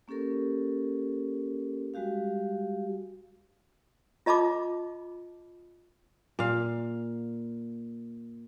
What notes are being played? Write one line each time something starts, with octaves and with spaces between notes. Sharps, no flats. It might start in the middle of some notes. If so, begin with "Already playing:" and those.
A#3 C#4 G4 A4 A#4
G3 G#3 F#4 G4 F5
F4 D#5 A5 B5 D6
A#2 F5